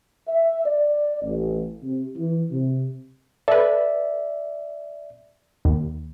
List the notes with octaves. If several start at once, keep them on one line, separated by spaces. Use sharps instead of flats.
E5
D5
A1
C3
E3
C3
A4 B4 D5 E5
D#2